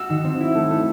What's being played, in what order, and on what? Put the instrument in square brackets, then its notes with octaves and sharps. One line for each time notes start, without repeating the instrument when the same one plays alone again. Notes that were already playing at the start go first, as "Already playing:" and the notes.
Already playing: [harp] F#4 [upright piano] E6
[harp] D#3
C4
E4
A3
A3